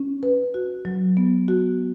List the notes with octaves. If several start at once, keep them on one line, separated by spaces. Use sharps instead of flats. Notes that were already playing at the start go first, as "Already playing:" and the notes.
Already playing: C#4
B4
F#4
F#3
B3
F#4